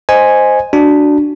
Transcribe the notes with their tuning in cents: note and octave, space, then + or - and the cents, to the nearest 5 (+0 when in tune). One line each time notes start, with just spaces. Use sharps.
C5 +0 D#5 -5 G#5 +0
D4 +0 F#4 +0